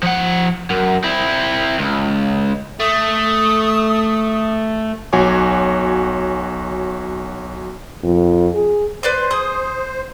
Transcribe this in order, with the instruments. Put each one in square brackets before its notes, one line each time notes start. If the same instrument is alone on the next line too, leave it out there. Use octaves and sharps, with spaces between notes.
[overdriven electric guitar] F3 F#5
F#2
C4 E4
C#2
[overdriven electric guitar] A3 [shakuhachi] D#6
[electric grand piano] B1 F#4 C#5 G#5 D6
[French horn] F2
G#4
[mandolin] B4 D5 C6 [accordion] C5
[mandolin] G#4 C6 D#6